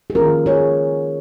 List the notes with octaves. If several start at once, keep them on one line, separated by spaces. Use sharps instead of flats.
G#4
D#3 A#3 C#4 F4 A#4
G#4 C#5